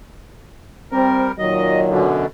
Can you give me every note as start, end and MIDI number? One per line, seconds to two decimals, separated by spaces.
0.91 1.32 55
0.91 1.26 60
0.91 1.32 70
1.39 2.03 46
1.39 2.03 51
1.39 2.03 54
1.39 1.80 75
1.88 2.26 42
1.88 2.26 47
1.88 2.26 50